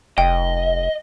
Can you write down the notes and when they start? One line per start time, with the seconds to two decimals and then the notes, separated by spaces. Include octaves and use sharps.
0.18 F1 D#5 G5